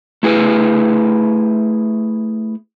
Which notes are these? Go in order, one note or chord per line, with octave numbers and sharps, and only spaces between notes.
A3 E4 G#4 B4